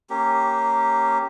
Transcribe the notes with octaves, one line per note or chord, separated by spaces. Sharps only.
A#3 C#4 G4